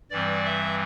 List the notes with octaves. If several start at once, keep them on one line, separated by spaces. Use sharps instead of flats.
G2 E3 G3 C4 D5
E5